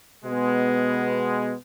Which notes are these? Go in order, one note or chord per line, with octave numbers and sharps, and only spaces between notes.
B2 G#3 B3